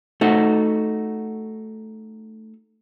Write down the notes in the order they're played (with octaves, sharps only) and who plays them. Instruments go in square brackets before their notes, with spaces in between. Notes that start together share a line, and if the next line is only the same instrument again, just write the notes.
[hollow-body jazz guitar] A3 D#4 F#4